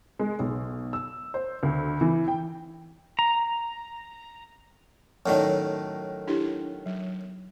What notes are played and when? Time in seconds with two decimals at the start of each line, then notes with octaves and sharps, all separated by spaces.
0.19 G#3
0.39 B1
0.93 E6
1.34 C5
1.63 D2
2.01 E3
2.28 G5
3.19 A#5
5.26 F#2 A2 D#3 C#5 D5
6.27 D4 E4 G4
6.86 F#3